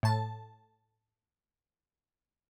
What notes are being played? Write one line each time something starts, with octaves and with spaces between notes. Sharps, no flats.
A2 A5